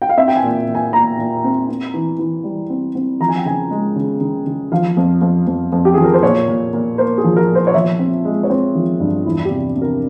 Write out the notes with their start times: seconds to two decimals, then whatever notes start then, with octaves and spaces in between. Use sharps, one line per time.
0.02 G5
0.09 F5
0.17 C4 E5
0.28 G5
0.36 G#5
0.43 A#2
0.68 A#2
0.75 G#5
0.93 A#2 A#5
1.18 A#2
1.44 C4
1.69 C4
1.94 E3
2.19 E3
2.44 G3
2.70 C4
2.95 C4
3.20 F3 A#5
3.28 G#5
3.37 G5
3.45 C#3 G#5
3.71 G#3
3.96 C#3
4.21 C#3
4.46 C#3
4.72 F3 F5
4.97 F2
5.22 F2
5.47 F2
5.72 F2
5.85 G4
5.94 F3 G#4
6.04 A#4
6.14 C5
6.23 A#2 C#5
6.48 A#2
6.73 A#2
6.98 A#3 C5
7.18 G#4
7.24 F3
7.36 A#4
7.48 A#2
7.55 C5
7.67 C#5
7.74 F3 E5
7.99 C4
8.25 G#3
8.43 C#5
8.50 C4 C5
8.75 F3
9.00 G2
9.26 E2 E4
9.45 G4
9.51 C3
9.76 C3
9.82 A#4